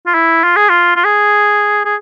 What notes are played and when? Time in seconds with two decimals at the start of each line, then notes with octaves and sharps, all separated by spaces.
0.06 F4
0.14 E4
0.44 F4
0.56 G#4
0.69 F4
0.96 F4
1.04 G#4
1.85 G#4